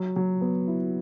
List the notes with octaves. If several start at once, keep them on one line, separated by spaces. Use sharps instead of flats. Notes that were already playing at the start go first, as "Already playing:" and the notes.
Already playing: F#3
F#3
B3
E4